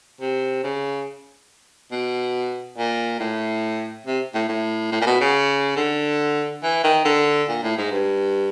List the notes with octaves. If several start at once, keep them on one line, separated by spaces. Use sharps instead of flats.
C3
C#3
B2
A#2
A2
C3
A2
A2
A2
A#2
B2
C#3
D3
E3
D#3
D3
A#2
A2
G#2
G2